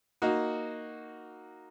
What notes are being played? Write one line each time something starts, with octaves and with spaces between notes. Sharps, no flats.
A#3 D#4 F#4